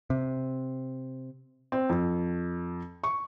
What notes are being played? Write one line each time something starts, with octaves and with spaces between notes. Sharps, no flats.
C3
C4
F2
C#6